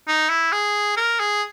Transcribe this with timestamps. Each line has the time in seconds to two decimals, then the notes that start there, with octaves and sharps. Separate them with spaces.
0.08 D#4
0.29 E4
0.53 G#4
0.97 A#4
1.20 G#4